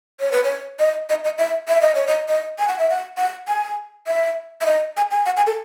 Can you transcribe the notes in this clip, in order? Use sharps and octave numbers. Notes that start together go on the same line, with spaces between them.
C#5
B4
C#5
D#5
D#5
D#5
E5
E5
D#5
C#5
D#5
D#5
G#5
F#5
E5
F#5
F#5
G#5
E5
E5
D#5
G#5
G#5
F#5
G#5
A4